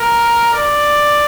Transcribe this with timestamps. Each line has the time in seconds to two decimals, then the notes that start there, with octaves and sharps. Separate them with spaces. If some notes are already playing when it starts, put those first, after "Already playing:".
Already playing: A#4
0.54 D5